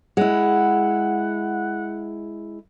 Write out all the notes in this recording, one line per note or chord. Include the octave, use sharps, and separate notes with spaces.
G#3 E4 F#5